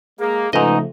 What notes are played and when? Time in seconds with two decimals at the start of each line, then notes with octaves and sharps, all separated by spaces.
0.19 G#3 A#3 G#4
0.53 G#2 C#3 F3 A3 D#4 B4 D#5